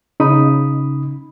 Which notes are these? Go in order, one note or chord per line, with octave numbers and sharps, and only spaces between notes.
C#3 D#4 B5 D#6